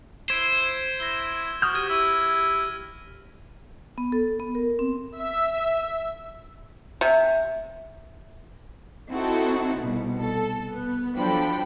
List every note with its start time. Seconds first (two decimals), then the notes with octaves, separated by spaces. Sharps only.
0.30 E4 C5 G#6 B6 D7
1.00 E4 A#6 G7
1.62 F#4 D#6 F6 G6
1.74 G4 F6 G#6 D#7
1.90 E4 E6 D#7
3.98 B3
4.12 A4
4.40 B3
4.55 A#4
4.79 C4
5.19 E5
7.01 C3
9.09 C4 D#4 E4 F#4 A4
9.76 C2 B2
10.18 A4
10.71 B3
11.17 F3 F#3 D4 A4 G5 B5